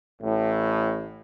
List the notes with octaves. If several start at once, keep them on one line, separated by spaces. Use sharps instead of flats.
A1 A2